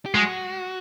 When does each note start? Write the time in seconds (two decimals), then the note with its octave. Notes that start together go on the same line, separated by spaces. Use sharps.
0.06 G4
0.14 G#3 F#4